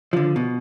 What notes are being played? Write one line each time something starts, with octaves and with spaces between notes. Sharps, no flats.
D3 F3
B2